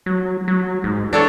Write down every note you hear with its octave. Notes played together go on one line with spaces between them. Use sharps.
F#3
F#3
G#2
E3 D4 A4 C#5